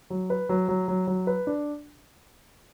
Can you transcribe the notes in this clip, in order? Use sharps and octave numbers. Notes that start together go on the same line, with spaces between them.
F#3
B4
F#3
F#3
F#3
F#3
B4
D4